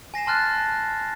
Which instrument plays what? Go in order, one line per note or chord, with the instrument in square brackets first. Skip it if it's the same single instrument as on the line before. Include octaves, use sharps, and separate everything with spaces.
[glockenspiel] G#5 A#6 C7 E7
A5 C6 F6 F#6 A6